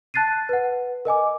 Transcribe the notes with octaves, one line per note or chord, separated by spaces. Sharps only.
A5 F#6 A6 C7 D#7
B4 F#5
A#4 D#5 G#5 D6